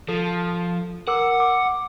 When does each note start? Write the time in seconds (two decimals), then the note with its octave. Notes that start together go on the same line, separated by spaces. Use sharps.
0.09 F3 A4
1.08 A#4 F#5 D6 E6
1.40 D6